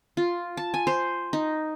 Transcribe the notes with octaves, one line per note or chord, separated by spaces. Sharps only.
F4
A5
G#5
C5
D#4